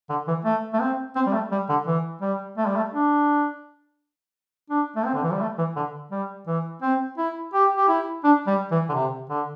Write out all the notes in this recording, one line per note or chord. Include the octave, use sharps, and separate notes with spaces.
D3
E3
A3
A3
C4
C4
G3
A3
G3
D3
E3
G3
A3
G3
A3
D4
D4
A3
C4
D3
E3
G3
A3
E3
D3
G3
E3
C4
E4
G4
G4
E4
D4
G3
E3
D3
C3
D3